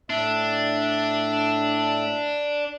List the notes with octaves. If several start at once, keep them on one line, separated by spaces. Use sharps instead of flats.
A2 D4 E5